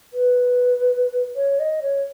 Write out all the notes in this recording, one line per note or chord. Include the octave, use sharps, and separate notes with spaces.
B4
C#5
D#5
C#5